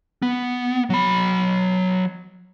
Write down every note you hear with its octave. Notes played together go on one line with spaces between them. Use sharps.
B3
F#3 B5